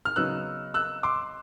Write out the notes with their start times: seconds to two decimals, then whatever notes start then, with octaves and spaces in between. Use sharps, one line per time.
0.05 F6
0.16 C#3 F#3 B3 D#4 E6 F#6
0.74 E6 F#6
1.03 C6 D6